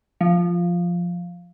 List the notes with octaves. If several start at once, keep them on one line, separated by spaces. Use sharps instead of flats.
F3